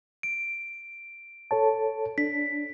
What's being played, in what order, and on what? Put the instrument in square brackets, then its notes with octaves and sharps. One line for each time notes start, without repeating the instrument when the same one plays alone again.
[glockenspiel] D7
[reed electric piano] A4 C#5 A5
[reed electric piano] D4 [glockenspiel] B6